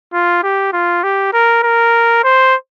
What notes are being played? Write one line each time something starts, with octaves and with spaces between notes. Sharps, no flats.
F4
G4
F4
G4
A#4
A#4
C5